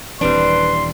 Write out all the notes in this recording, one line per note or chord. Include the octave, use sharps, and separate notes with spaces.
D#1 E3 G3 C4 D4 B4 C6